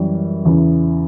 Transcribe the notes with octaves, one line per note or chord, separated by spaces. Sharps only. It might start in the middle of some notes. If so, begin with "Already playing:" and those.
Already playing: F#2 E3 G3
E2 C#3 E3